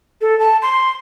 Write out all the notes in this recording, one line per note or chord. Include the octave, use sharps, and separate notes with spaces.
A4
A5
C6